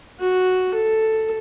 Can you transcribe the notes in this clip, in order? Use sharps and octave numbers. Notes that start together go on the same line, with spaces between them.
F#4
A4